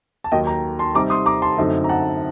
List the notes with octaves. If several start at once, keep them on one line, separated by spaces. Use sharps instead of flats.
A5
D#2 D#3 F#3 D#5 G5
G5 A#5
A5 C6
C3 G3 C4 D#4 A#5 D6
C6 D#6
A#5 D6
A5 C6
F#2 D3 A3 C4 D#4
A#5
F#5 A5